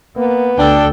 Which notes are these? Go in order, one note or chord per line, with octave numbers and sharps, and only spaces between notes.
A#3 B3
D2 D4 A4 G5